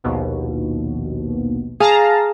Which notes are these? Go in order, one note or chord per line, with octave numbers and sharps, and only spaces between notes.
A#1 D#2 B2
G#4 F5 A5 A#5